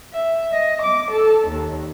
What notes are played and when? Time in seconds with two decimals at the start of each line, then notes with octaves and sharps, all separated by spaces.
0.13 E5
0.53 D#5
0.84 D6
1.13 A4
1.50 D#2